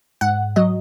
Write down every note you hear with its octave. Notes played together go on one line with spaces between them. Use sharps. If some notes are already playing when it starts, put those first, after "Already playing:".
G#2 F#5
F#3 D#5